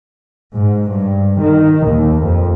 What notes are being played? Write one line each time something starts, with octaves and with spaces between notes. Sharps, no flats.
G#2
G2
D#3
D#2
F2